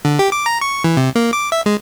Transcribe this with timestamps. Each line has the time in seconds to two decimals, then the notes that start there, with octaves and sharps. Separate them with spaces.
0.05 D3
0.19 G4
0.32 D6
0.46 A#5
0.61 C#6
0.84 E3
0.97 C3
1.15 A#3
1.33 D6
1.52 E5
1.66 G#3